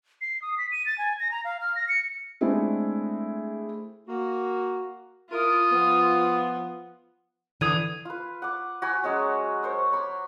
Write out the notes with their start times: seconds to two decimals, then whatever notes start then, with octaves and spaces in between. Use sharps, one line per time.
0.21 C7
0.42 D#6
0.58 B6
0.72 D#7
0.86 A6
0.98 G#5
1.20 A#6
1.31 A#5
1.44 F5
1.61 F6
1.76 A#6
1.89 C#7
2.41 G#3 A3 C4 D4 E4 G#4
4.08 A#3 F#4
5.31 E4 F4 A#4 D#6
5.70 F3 B3
7.61 D3 E3 D4 D#6 G#6 D#7
8.05 F4 B4
8.42 F#5 D6
8.82 F#4 G#5 B5
9.04 F#3 G#3 C#4
9.63 A#4 C5 C#5
9.92 C#5 B5 C6 D6